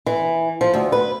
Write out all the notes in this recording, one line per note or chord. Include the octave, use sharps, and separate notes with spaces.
E3
F3
D2
B4